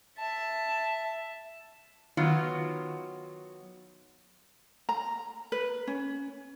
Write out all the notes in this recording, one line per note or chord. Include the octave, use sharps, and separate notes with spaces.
E5 A5
D#3 F#3 B3 F4
A#5
B4
C#4